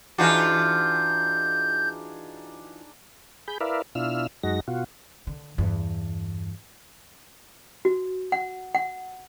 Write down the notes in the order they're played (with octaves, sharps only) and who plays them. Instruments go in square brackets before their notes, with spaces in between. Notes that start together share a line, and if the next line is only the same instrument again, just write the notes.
[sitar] E3 F4 F#4 [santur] D4 D#4 G#4 [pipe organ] G6
[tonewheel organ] G#4 B5 G6
E4 A#4 B4 D5 E5 F5
B2 D4 E4 F4 E6 F6
F#2 G#3 D#4 F#4 A#6
B2 F4 F#4
[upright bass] D3
E2 G2
[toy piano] F#4
F#5
F#5